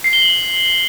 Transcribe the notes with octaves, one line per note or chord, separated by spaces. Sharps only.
C7
G7
F#7